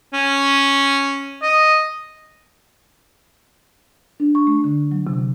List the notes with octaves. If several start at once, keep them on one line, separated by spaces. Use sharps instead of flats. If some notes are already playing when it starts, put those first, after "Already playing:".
C#4
D#5
D4
C#6
A3
D3
F#3
C3